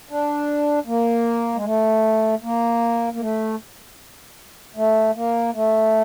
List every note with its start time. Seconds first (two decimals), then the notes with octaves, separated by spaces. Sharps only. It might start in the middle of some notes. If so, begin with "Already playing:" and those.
0.09 D4
0.87 A#3
1.55 G#3
1.65 A3
2.43 A#3
3.13 A#3
3.21 A3
4.76 A3
5.15 A#3
5.54 A3